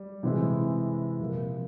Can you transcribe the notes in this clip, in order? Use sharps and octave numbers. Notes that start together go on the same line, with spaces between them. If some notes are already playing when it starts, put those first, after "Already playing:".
Already playing: G3
C3 E3 G#3 C4 E4
C3 F3 A#3